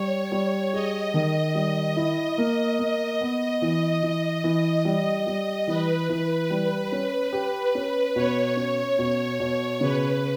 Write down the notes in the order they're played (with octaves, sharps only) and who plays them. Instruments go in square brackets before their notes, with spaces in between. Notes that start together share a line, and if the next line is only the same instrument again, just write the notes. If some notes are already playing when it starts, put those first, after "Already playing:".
Already playing: [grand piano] G3 [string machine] C#5
[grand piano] G3
[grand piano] G#4 [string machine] D#5
[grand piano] D#3
G3
E4
A#3
A#3
[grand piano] B3 [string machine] D#5
[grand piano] E3
E3
E3
[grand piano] G3 [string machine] D#5
[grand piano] G3
[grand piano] E3 [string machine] B4
[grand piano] E3 [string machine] B4
[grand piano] G3
C#4
G4
C#4
[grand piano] B2 [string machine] C#5
[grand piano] C#4
B2
B2
[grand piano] C#3 [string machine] B4